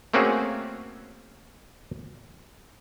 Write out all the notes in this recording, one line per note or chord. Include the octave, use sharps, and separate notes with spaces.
A3 A#3 C4 C#4 F#4 G#4